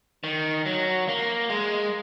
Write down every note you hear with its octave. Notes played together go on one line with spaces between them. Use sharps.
D#3
F#3
A#3
G#3